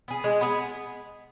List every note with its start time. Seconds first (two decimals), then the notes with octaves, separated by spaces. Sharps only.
0.08 B3 G#4
0.24 G#3
0.41 B3 G#4